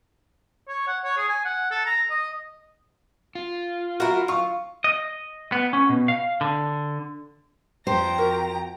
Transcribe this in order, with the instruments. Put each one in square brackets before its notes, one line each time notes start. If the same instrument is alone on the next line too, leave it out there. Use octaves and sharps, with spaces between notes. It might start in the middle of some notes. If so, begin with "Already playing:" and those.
[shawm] C#5
F#5
C#5
G#4
G#5
F#5
A4
A#5
D#5
[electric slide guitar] F4
[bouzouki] E4 A#4 [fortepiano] F#4
[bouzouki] F4 [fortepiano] F5 C#6
[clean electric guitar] D#5
B3
C#4
B2
F5
D3
[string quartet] F2 A#5 [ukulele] G4 [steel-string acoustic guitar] C5 [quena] G5
[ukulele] F#4 A#4